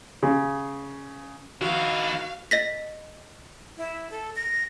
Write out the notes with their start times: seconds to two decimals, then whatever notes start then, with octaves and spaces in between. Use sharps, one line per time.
0.23 C#3
1.61 D#3 E4 F#4 F5
2.51 D#5 A#6 B6
3.77 E4
4.11 A4
4.36 A#6